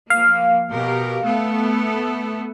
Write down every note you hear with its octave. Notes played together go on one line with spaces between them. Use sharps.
F3 A#3 F5
B2 G4 A#4
A3 B3 A4